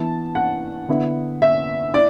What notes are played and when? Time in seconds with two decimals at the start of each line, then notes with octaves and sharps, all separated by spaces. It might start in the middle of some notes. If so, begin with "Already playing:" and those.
Already playing: E3 B3 E4 A5
0.35 F#5
0.89 D3 B3 E4
1.42 E5
1.94 E4 D5